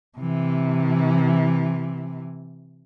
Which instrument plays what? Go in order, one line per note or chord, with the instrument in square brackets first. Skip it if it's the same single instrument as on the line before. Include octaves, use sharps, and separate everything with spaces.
[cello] C3 E3